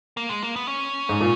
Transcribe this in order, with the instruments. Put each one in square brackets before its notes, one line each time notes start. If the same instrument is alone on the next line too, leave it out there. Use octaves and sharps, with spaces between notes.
[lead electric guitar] A#3
G#3
A#3
B3
C#4
[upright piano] G#2
A#2